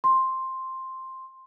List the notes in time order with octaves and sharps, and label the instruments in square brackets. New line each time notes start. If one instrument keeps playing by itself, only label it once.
[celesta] C6